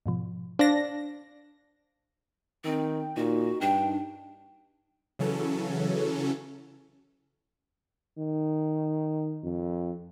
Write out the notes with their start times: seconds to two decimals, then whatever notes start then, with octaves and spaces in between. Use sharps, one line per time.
0.06 G#2 B2 F3
0.59 D4 C5 F5 A#6
2.65 D#3 C4 G5
3.17 A#2 D#4 F#4
3.61 G2 D4 G5
5.19 C#3 E3 F#3 C#4 A4
8.18 D#3
9.43 F2